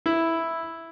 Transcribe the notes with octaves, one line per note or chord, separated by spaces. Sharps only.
E4